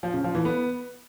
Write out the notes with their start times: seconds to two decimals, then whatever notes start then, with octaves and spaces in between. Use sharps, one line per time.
0.03 F3
0.14 C#3
0.24 F3
0.35 E3
0.45 B3